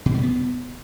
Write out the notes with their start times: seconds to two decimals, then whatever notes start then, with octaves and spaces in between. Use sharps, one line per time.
0.06 B2
0.14 G3
0.23 B3